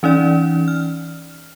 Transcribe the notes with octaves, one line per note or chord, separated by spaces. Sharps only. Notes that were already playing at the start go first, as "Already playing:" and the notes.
E3 C#4 D#4 D5
F6